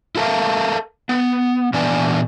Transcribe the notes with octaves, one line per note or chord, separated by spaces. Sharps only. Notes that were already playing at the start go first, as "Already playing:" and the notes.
E4 F4 A4 A#4 E5 F5
B3
A#2 E3 B3 D4 D5 G#5